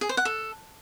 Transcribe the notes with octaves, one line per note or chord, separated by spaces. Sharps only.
G#4
C5
F#5
A4